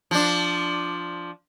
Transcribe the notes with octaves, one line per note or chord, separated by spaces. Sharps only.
F3 D4